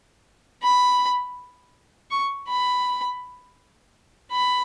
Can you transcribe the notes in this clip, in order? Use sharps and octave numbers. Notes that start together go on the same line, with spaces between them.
B5
C#6
B5
B5